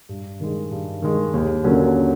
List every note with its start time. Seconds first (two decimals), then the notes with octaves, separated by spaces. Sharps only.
0.09 G2
0.40 D#3 G#3
0.71 G2
1.02 D#3 G#3
1.33 D#2
1.64 D3 F#3 A#3 C#4